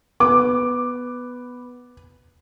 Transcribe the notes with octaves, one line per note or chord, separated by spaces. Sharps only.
B3 D6